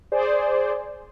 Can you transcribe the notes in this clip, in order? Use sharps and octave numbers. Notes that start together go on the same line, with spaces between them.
G#4 C5 D5